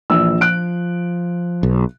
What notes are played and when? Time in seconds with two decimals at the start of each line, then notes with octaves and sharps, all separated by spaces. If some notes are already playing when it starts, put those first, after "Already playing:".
0.10 A#1 E3 E6
0.41 F3 F#6 D7
1.63 B1